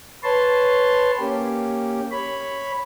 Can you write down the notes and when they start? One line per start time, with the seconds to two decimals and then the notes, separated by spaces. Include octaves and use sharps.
0.23 B4 C#5 A5 C6
1.19 A#3 C#4 G4
2.11 C#5 B5